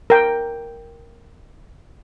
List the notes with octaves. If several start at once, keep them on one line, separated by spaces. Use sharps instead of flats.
A#4 G5